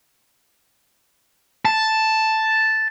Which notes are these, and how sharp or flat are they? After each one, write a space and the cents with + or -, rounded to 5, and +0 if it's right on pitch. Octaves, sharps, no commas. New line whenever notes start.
A5 +0